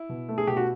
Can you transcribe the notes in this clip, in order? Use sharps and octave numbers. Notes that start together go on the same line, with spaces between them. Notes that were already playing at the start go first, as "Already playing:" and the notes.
Already playing: E4
B2
A3
G#4
B2 G4
F#4